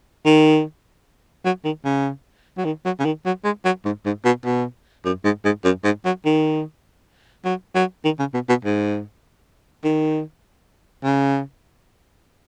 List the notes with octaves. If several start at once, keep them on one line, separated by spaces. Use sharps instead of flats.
D#3
F#3
D#3
C#3
F#3
D#3
F#3
C#3
D#3
F#3
G#3
F#3
G#2
G#2
B2
B2
F#2
G#2
G#2
F#2
G#2
F#3
D#3
F#3
F#3
D#3
C#3
B2
B2
G#2
D#3
C#3